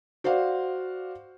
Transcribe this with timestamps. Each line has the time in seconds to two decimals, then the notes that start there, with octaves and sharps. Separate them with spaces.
0.24 F#4 C5 D5 F5 F#5